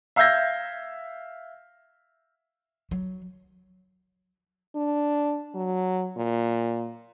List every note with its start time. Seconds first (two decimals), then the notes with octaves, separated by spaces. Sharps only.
0.16 E5 F5 E6 G6 G#6 A#6
2.91 F#3
4.76 D4
5.55 F#3
6.17 A#2